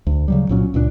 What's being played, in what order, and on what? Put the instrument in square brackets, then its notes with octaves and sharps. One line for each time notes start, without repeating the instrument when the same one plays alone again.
[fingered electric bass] D2
C#3 F#3 G3
C2 A#2 F#3 C#4
C#2 A#2 G#3 D4